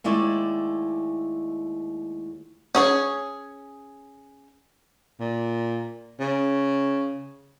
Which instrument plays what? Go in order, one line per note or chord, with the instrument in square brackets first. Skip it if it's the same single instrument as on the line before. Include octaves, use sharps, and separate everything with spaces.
[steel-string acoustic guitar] D#2 G#3 A3 E4 D5
[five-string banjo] C#4 G#4 C#5
[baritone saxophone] A#2
C#3